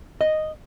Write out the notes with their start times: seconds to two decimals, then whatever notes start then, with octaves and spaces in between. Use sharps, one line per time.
0.21 D#5